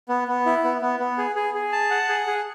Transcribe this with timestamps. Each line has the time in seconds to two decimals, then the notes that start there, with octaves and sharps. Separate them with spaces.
0.09 B3
0.28 B3
0.46 E4
0.64 B3
0.81 B3
1.00 B3
1.18 G#4
1.36 G#4
1.54 G#4
1.72 A5
1.90 F#5
2.09 G#4
2.27 G#4